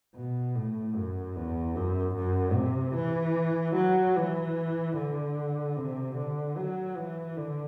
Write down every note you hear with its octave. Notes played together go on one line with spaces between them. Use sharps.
B2
A2
F#2
E2
F#2
F#2
C3
E3
F#3
E3
D3
C3
D3
F#3
E3
D3